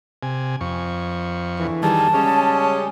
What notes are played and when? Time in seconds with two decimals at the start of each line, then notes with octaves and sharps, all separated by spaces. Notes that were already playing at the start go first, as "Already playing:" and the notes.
0.23 C3 G#5
0.61 F2 C#6
1.60 E2 D3 E3
1.83 D#3 G3 G#4 A5
2.14 C#3 G3 G#3 C#4